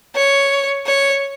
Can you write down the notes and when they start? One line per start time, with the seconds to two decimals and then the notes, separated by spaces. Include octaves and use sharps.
0.16 C#5
0.87 C#5